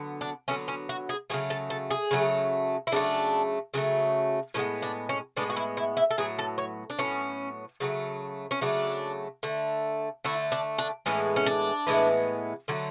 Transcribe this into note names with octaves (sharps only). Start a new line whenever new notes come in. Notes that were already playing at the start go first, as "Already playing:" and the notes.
Already playing: D3 F#3 B3
D4
D3 F#3 B3 C#4
C#4
F#4
G#4
C#3 F#3 A3 G#4
A4
A4
G#4
C#3 F#3 A3
E4
C#3 F#3 A3 D4
C#3 F#3 A3
A2 G#3 B3 C#4
D4
C#4
A2 G#3 B3 D4
F#4
E4
E4
E4
A4
A2 F#3 B3 G#4
A4
C#5
D4
A2 F#3 B3 C#4
C#3 F#3 A3
C#4
C#3 F#3 A3 D4
D3 A3
D3 A3 E4
D4
D4
A2 E3 G#3 B3 C#4
C#4
D4
A2 E3 G#3 B3
D3 F#3 A3